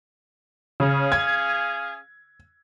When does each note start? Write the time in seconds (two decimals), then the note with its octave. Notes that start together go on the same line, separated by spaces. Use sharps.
0.80 C#3 C#4 G#4 F5
1.12 G#6